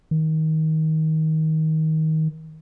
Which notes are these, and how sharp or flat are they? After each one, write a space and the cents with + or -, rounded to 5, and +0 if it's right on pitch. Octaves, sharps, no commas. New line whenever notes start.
D#3 +20